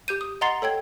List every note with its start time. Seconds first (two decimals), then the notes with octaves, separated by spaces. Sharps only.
0.08 G4 G6 D#7
0.21 D#6
0.41 D#5 F#5 A#5 C6 A6 C7
0.62 A4 C#5 G5 G#6